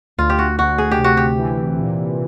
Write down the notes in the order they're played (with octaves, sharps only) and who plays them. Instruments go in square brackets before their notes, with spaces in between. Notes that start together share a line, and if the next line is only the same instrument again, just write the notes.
[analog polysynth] D2 [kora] F4
[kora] G4
F#4
[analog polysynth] D2 [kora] F#4
[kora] G#4
G4
[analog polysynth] C3
[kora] F#4
G4
[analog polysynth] E3
A#2